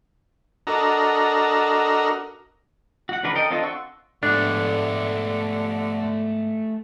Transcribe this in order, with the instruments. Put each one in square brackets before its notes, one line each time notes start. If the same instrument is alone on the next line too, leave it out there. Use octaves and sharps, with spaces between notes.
[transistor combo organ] D4 F#4 A4 A#4 D#5 A#5
[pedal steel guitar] F#4 F#5
C#3 E3 D4 A#4 B4
A4 A#4 D#5 G5
C4 D4 F4 A4 D#5
F#5 C6 C#6 E6 F#6
[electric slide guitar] G#2 B3 [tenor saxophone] D3 [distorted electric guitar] A3 G4 [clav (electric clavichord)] D4